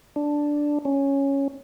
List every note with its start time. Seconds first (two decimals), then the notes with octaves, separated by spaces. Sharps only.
0.16 D4
0.85 C#4